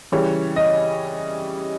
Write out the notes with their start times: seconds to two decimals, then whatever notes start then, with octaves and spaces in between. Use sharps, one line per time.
0.12 C#3 E3 G3 C#5
0.56 D#5